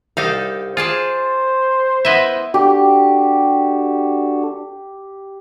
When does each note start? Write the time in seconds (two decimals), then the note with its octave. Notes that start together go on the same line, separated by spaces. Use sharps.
0.17 C2 D#4 G4 A4 F5
0.77 F4 G#4 C5 D5 A5
2.05 B3 E4 B4 D#5 E5
2.54 D4 F#4 G4 A4